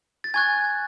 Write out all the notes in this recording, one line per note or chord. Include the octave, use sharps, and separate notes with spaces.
A6
G#5 C#6 F#6 G#6